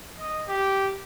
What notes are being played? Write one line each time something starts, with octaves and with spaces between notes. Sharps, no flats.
D#5
G4